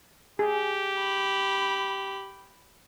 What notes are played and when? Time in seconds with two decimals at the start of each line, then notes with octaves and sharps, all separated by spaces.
0.39 G4 G#4
0.99 B5